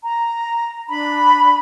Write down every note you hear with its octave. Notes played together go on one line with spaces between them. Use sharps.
A#5
D4 B5